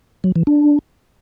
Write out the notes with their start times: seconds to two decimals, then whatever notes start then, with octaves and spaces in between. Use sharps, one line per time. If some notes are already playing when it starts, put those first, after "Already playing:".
0.24 F#3
0.35 E3
0.47 D4